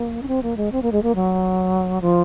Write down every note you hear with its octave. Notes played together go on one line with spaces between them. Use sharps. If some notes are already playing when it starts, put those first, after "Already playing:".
Already playing: A#3
C#4
C4
A#3
G#3
C4
A#3
G#3
A#3
F#3
F3